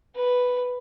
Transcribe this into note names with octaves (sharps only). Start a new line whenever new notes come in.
B4